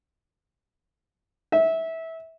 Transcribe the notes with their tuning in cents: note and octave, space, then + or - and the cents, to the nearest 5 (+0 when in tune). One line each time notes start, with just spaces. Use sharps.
E5 -20